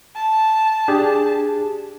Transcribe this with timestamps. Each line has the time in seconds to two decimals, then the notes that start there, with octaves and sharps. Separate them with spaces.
0.16 A5
0.88 D4 G4 G#4